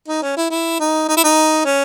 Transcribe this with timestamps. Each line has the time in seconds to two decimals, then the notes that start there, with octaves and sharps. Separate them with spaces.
0.08 D#4
0.22 C#4
0.37 E4
0.51 E4
0.80 D#4
1.09 D#4
1.17 E4
1.24 D#4
1.65 C#4